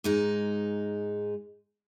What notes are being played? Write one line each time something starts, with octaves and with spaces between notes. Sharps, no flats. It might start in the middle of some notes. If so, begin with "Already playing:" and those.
G#2 G#3 D#4